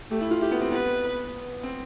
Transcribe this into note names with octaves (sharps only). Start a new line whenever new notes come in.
A3 G4
E4
F4
E4 G4
B3
C4
B3 B4
C4